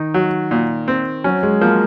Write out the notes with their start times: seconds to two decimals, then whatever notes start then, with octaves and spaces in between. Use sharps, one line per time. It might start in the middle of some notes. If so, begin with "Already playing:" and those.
Already playing: D#3 D#4
0.14 F#3
0.51 A#2
0.88 C4
1.24 F#3 C#4
1.43 G#3
1.61 F3 A#3